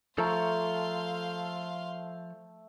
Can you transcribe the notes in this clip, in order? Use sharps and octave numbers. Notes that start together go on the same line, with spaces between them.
F3 A3 A4 F5 A#5 C6